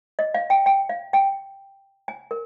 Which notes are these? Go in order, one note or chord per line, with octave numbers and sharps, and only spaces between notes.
D#5
F5
G5
G5
F5
G5
G#5
A#4